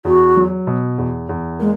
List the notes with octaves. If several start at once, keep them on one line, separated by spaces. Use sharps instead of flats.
E2 F#4
F#3
B2
E2
E2
G#3 A#3